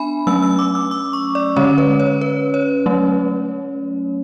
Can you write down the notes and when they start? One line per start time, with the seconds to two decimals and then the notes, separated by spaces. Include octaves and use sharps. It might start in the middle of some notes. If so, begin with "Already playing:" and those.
Already playing: B3 D4 E5 G#5 B5
0.27 F#3 A3 C#4 E6
0.42 E6
0.59 D6
0.75 E6
0.91 D6
1.13 C#6
1.35 D5
1.56 D3 G#3 C#4 C#5
1.78 B4
2.00 C#5
2.21 B4
2.54 C#5
2.86 F#3 A3 C#4